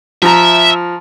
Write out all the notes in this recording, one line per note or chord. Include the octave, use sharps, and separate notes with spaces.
F3 E5 A#5